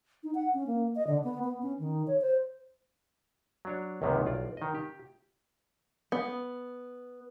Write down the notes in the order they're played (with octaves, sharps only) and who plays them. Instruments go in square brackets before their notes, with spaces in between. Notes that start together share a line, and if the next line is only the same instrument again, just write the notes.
[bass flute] D#4
F#5
C#4
A#3
D#5
D3
B3
B3
C#4
D#3
C#5
C5
[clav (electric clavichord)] F#3 D4 C#5
C#2 F#2 C3 D#3 A#3 B3
B1 F4 D5
D#3 D#5
G4
[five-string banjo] B3